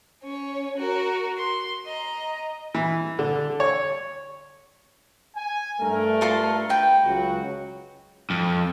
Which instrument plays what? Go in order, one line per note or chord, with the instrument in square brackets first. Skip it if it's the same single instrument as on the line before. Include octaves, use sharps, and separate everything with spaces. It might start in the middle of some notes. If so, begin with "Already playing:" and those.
[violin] C#4 C#5
F#4 A#4
C6
D#5 A#5
[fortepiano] E3
D3
C#5
[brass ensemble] G#5
G2 A3 A#4
[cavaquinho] F4 A4 C6
B4 G5
[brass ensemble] C#2 F#3 F#4
[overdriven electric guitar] F2